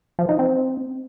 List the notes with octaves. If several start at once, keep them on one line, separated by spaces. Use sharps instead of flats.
F3
D#4
C4